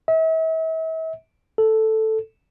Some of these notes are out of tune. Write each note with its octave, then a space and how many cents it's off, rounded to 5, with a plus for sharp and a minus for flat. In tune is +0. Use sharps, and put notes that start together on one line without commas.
E5 -40
A4 +0